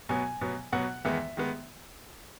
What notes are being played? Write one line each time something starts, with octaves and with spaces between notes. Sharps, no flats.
B2 F#3 B3 G#5
B2 F#3 B3
B2 F#3 B3 F#5
E2 D#3 G#3 B3 E5
D#3 G#3 B3